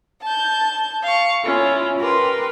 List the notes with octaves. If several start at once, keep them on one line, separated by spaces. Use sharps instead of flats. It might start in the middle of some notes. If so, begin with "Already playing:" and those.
A5 G6
F5 C#6
C#4 E4 F4
G4 A#4 B4 C6